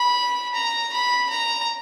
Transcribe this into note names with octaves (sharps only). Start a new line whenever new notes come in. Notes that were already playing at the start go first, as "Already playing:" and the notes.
Already playing: B5
A#5
B5
A#5